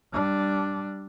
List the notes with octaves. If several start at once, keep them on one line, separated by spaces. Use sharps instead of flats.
G3 D4